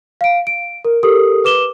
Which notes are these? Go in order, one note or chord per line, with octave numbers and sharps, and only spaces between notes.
F5 D7
D7
A#4
G4 A4 A#4 D#6
B4 D6 E7 G7